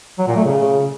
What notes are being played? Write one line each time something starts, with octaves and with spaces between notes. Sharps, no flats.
F#3
A#2
A3
C#3